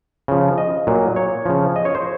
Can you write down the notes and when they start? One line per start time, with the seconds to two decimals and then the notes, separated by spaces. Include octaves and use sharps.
0.28 C#3 F3
0.58 D#5
0.87 A#2 F#3
1.16 C#5
1.46 C#3 F3
1.76 D#5
1.85 C#5
1.95 C5